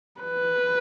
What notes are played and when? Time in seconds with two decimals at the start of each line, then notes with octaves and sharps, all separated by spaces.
0.21 B4